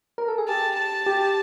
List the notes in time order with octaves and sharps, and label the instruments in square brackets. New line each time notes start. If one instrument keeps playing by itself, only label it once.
[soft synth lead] A#4
A4
G#4
[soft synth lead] G4 [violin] A5
[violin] A5
[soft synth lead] G4